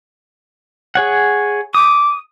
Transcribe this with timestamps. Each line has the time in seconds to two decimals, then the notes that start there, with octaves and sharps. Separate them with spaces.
0.95 G#4 C#5 F#5
1.74 D6 D#6